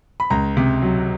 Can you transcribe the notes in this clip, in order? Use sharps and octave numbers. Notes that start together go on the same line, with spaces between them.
B5
C#2 A#5
C3
F#3